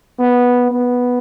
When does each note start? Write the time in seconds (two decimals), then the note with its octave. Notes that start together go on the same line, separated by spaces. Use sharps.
0.19 B3
0.71 B3